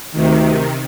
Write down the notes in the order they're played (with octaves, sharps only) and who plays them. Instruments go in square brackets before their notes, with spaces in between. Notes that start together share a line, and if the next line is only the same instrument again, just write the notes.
[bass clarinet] D2 [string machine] C3 D#3